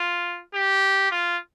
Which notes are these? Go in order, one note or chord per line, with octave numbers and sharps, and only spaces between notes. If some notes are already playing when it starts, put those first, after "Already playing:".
Already playing: F4
G4
F4